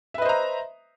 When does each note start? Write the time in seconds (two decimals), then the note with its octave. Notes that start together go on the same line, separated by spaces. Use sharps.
0.14 E5
0.18 B4
0.22 D#5
0.25 C5
0.29 A#5